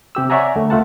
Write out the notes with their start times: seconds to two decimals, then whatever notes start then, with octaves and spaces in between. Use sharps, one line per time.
0.15 C3 G4 E6
0.30 C#5 D5 E5 F#5 G#5 A#5
0.55 D2 A3
0.70 C#2 A3 F4 F#5 A5